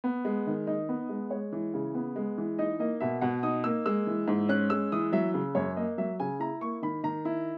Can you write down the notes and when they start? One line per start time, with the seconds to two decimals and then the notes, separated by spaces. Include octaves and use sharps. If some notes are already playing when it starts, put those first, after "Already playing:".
0.04 B3
0.25 G#3
0.47 D#3
0.67 D#4 D#5
0.89 B3
1.09 G#3
1.30 G#3 C#5
1.52 E3
1.74 C#3
1.95 B3
2.16 G#3
2.38 E3
2.58 D#4 D#5
2.79 A#3 D#5
3.00 B2 E5
3.21 B2 F#5
3.43 D#4 D#6
3.64 A#3 E6
3.86 G#3 E6
4.07 E3
4.28 G#2
4.49 C#4 F#6
4.70 G#3 E6
4.92 E3 D#6
5.12 F#3 E5
5.34 C#3
5.55 F#2 C#5
5.77 A#3 D#5
5.98 F#3 E5
6.20 C#3 G#5
6.40 E4 A#5
6.61 A#3 C#6
6.82 D#3 B5
7.03 D#3 A#5
7.25 E4